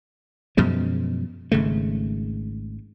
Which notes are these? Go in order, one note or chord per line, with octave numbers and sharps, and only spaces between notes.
F#2 B2 F3 G#3
G#1 C#3 A3